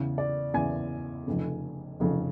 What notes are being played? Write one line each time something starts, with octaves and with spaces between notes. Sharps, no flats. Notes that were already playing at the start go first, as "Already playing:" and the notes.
Already playing: E2 C#3 E3
D5
E2 C#3 E3 G#5
F1 F2 C#3
F1 F2 C#3